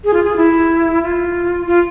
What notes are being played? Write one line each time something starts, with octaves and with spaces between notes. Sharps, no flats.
G#4
F4
G#4
E4
F4
F4